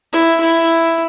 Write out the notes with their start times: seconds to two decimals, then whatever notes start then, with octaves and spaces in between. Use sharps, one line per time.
0.13 E4
0.41 E4